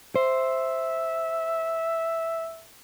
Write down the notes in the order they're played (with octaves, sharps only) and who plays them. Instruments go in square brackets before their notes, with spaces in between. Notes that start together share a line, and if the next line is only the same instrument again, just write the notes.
[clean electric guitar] C5 [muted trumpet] E5